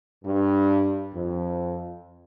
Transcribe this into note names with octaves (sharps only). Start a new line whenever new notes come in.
G2
F2